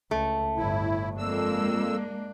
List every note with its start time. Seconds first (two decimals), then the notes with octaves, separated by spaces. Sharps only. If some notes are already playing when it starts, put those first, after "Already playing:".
0.11 C#2 A3
0.57 G1 A2 E4
1.18 F2 G#3 A#3 D4 E6